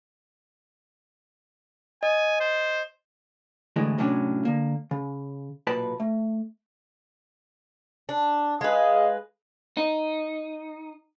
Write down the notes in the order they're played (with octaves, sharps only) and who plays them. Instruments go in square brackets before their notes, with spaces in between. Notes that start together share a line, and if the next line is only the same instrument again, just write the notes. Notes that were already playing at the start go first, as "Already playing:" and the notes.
[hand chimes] D#5 [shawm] G#5
[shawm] C5
[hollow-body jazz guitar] D2 A2 E3 G#3
A2 C3 F#3 C#4 D4
D3 A#3
C#3
B1 A#2 B4 A5 B5
A3
[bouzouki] D4
[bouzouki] G#3 B4 [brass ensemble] G#4 D#5 F5
[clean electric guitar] D#4